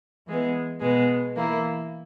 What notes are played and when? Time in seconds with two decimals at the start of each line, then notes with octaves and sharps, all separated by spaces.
0.27 E3 G#3 B3
0.81 B2 G#3 B3
1.36 E3 A#3 E4